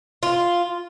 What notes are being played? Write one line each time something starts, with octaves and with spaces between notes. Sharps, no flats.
F4